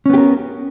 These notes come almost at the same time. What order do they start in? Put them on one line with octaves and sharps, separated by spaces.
C#4 B3 G4 A#4